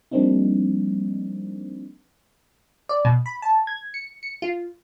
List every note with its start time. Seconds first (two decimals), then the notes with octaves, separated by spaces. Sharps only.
0.11 F3 G3 A#3 C4 D4 D#4
2.89 D5
3.05 B2
3.26 B5
3.42 A5
3.67 G#6
3.94 C#7
4.23 C#7
4.42 F4